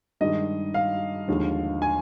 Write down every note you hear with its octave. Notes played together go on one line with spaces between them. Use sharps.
G2 D#3 G#3 D#5
F5
D#2 D3 F3 G#3
G#5